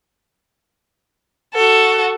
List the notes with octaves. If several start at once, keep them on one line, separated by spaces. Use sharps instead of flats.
F#4 A4